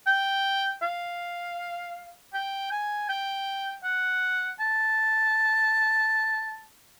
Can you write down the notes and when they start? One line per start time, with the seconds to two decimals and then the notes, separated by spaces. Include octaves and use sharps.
0.07 G5
0.82 F5
2.34 G5
2.72 G#5
3.09 G5
3.84 F#5
4.60 A5